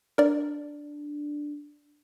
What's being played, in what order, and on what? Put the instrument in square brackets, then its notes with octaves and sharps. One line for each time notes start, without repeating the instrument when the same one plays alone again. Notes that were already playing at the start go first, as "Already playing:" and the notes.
[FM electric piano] D4 [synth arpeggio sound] A#4 D5